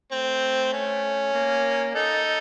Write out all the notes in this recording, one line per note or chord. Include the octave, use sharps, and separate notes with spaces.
A3 C4
C#4
A#3
D#4 A4